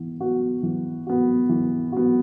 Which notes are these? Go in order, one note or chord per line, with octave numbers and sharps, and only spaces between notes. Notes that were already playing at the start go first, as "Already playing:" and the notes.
Already playing: E3 B3
B3 F#4
E3
B3 F#4
E3
B3 F#4